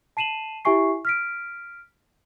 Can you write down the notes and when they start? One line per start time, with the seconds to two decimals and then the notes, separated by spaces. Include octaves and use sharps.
0.17 A5 C7 D#7 E7 F#7
0.65 E4 G4 E5 G#5 C#6 C7
1.05 F6 B6 D7